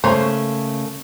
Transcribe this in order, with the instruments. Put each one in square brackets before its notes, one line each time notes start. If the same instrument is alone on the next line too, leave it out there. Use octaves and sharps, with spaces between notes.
[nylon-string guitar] C#3 A3 A#3 [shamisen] C5 C#5